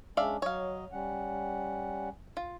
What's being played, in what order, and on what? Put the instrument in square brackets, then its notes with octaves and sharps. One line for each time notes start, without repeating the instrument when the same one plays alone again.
[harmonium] G#3 C#4 D4 [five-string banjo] D5 E5 F5
[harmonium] F#3 D#5 [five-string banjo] C#5 F5
[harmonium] G3 C#4 F#5
[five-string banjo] F4